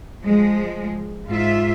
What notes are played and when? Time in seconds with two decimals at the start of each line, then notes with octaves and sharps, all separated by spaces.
0.24 F3 G#3
1.28 G#2 F4 E5